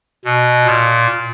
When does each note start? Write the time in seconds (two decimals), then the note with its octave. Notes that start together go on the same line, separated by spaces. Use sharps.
0.25 B2
0.65 A#2